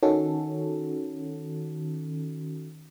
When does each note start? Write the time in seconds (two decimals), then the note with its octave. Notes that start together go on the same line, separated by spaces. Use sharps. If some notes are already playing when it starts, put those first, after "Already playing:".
0.03 D#3 C#4 F#4 A4